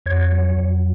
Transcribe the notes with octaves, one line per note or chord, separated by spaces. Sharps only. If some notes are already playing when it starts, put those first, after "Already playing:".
F2 C#5
F#3
F2